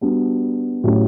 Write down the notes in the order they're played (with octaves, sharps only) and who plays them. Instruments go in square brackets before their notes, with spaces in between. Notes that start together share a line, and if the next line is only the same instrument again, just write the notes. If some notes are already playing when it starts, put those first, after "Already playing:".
[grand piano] G3 B3 D4 F#4
A2 F#3 C#4 E4 G4